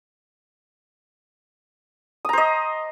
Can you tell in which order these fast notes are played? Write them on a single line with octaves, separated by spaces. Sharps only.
D#6 A#5 C5 D#5